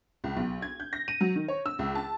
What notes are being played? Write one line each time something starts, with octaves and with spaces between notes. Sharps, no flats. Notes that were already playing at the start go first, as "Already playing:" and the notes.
C#2
B1
G#6
G6
A#6
D#7
F#3
D#3
C#5
E6
C#2
A5